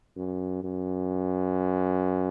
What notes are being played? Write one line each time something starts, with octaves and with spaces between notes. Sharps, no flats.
F#2
F#2